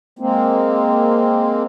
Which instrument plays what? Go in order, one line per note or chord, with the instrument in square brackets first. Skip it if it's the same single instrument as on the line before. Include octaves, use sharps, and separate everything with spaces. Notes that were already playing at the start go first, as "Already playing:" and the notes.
[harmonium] G#3 A#3 C4